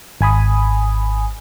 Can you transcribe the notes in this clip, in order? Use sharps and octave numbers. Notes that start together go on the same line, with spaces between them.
G#1 G#5 B5 D#6